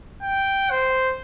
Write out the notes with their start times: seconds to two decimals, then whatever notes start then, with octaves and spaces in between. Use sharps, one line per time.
0.22 G5
0.71 C5